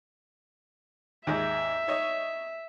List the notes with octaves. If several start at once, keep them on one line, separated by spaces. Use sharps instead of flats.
D#2 G#2 G#3 E5
D#4 C#5 D#5